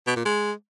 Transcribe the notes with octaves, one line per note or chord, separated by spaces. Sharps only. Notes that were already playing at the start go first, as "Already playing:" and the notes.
B2
A#2
G#3